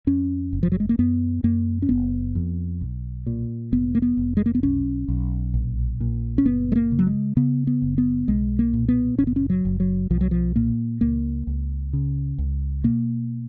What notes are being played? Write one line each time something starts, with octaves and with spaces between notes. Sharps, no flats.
F2 C#4
F#1
F3
F#3
G#3
A#3
F#2 B3
F#2 A#3
C#4
F#1 B3
F2
B1
A#2
F1 B3
A#3
B3
F1
G#3
A#3
B3
B1 C#4
B1
A#1
A#2
C#4
F#1 B3
G#3
A#3
C#3
F#3
G#3
C#3 B3
B3
F#1
B3
B1 G#3
A#3
A#2
B3
F#1 C#4
B3
C#4
F#3
F#1
F#3
B1 F3
F#3
F3
A#2 A#3
C#2 A#3
C#2
C#3
C#2
B2 A#3